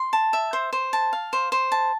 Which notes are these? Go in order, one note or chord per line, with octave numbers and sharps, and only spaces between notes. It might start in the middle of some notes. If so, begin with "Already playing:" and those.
Already playing: C6
A5
E5
C5
C5
A5
F5
C5
C5
A5